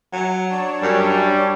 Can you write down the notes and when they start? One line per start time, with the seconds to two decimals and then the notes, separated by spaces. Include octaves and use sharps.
0.13 F#3
0.49 D4 C#5 A5
0.82 F#2 G3